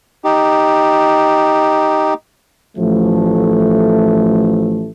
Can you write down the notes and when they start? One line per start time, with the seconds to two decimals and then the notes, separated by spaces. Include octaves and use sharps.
0.24 D#4 G4
2.77 A1 F3 A3